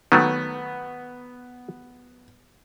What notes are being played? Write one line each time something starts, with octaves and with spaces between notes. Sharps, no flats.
D#3 F#3 A3 B3